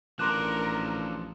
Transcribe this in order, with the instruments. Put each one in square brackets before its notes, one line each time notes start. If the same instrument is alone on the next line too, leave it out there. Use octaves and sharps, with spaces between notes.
[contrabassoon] A1 [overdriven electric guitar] F3 D4 [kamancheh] A#4 [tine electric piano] C6 D6 F#6